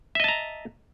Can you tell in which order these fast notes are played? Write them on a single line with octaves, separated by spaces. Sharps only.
E5 D#5 A5 A#5